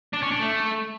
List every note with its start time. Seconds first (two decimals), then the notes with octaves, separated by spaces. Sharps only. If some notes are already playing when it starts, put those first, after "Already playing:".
0.14 D4
0.23 C#4
0.32 D4
0.41 A3